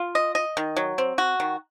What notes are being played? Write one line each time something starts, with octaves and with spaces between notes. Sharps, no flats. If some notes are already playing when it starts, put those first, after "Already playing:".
Already playing: F4
D#5
D#5
D#3
F#3
C4
F#4
D#3